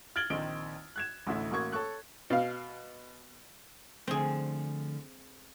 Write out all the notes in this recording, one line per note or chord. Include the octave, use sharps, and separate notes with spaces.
F6 G#6 A6 D7 F#7 G7
A#1 D#3 C4 D#4 D7 G7
F#6 G#6 E7
A1 D2 E4
A1 A#3 F#4 C#6 G#6
A4 C#5 C#6 F#6
B2 F5
D3 F3 A3 C4 G#4